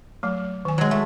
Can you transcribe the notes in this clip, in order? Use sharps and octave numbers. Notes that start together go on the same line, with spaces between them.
F#3 A3
D#3 G#5
F#3 G#3
A3